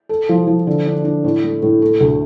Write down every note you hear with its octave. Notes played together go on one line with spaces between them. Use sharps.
A4
F3
F3
D3
D4
D4
A2
A3
A2
A3
D2